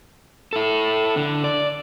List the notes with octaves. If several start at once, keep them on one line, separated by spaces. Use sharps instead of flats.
E4 A4
D3
D5